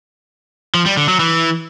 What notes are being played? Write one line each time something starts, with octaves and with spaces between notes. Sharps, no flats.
F3
G3
D3
F#3
E3